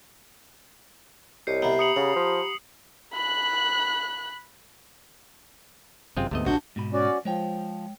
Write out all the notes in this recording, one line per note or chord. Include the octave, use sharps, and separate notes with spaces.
C2 G4 C#5 D#5 C7
C3 B3 G4 A#5 B5
D#6 C#7 F#7
C#3 F#5
F3
B5 F#6
G1 F#2 C3 G#3 C4 F4
D2 G#2 C3 A3 B3 D#5
A#1 D4 F#4 G6
G#2 B2 B5
C#4 F#4 D5
F3 G#3 C#5 G5